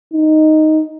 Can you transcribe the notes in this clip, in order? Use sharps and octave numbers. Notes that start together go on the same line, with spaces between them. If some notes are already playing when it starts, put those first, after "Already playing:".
D#4